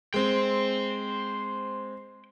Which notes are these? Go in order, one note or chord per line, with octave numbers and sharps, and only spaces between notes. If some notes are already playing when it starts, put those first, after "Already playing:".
G#3 C4 C5 G5